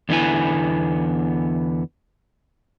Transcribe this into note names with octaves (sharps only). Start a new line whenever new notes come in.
E2 D3 B3 E4 G#5